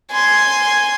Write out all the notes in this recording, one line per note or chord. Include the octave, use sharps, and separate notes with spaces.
G#5 C6